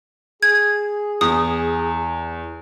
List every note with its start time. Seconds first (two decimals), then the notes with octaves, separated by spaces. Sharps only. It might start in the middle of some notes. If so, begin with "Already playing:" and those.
0.43 G#4 G#6
1.21 E2 D#6